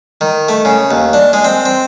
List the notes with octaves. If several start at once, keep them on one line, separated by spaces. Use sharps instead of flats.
D#3
A3
C#3
D#2
D4
G#3
C4
C4